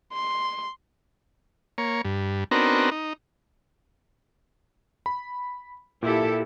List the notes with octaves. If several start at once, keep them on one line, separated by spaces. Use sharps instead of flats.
C6
A#3 C#5
G2
B3 C4 D4 D#4 F#4 A#4
D#4
B5
A#2 E4 G4 A4